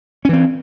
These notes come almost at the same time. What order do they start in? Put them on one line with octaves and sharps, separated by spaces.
C#4 E3 C4